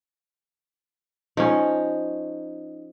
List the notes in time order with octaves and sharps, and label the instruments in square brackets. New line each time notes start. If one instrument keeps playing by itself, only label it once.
[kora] F3 C#4 [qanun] D#4